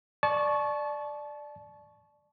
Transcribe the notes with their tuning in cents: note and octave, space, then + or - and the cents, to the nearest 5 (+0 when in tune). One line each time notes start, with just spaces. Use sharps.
D5 +10 A5 -30 C#6 +0